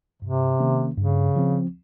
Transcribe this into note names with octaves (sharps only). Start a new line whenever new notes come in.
G2 C3
D#3 A#3 C#4
G2 C#3
F3 C4